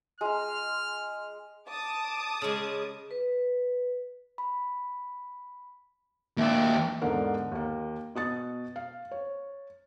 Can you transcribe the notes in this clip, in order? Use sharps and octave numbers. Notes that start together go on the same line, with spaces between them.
G#3 A#5 F6
A5 D6 D#6
C#3 G#3
B4
B5
D#2 A#3 D4 E5 G5
E1 G#2 D3 A#4
D#2 A#3
B2 D#6 A6
F5
C#5